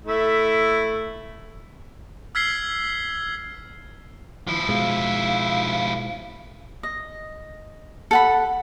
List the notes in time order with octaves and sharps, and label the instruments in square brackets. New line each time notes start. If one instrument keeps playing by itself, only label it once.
[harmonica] A3 E4
[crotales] E6 F6 G#6 B6 C7 G7
[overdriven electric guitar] F3 E4
[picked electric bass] B2 G#3 [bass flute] F5
[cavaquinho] D#5
A4 F#5 B5